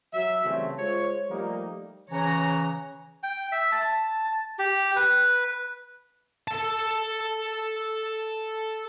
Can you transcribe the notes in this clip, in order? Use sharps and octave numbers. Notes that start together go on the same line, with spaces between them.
F#3 E5
C#3 E3 G3 A3 C4 C#4
G#3 F4 C5 C#5
F3 G3 A3 A#3 D#4
C#3 E3 C#5 A#5
G5
E5
A5
G4
B4
A4 A5